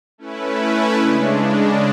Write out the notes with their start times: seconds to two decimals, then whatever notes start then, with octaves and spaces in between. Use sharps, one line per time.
0.18 A3 C#4 E4 B4
0.96 C#3 G#3 D4